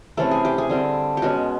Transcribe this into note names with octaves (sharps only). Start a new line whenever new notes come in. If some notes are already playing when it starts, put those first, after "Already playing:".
C3 E3 A3 C#4 A4
G#4
G4
G#4
D3 G3 C4
G4
B2 G#3 C#4 F#4